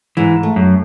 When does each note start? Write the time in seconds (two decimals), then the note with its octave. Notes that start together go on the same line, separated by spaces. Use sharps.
0.17 G#2 E3
0.43 A3
0.56 F#2